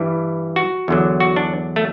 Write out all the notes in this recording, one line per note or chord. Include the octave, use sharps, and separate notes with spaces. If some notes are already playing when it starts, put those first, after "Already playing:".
Already playing: G2 E3 G3 E4
F#4
E2 D3 F#3
F#4
D4
A3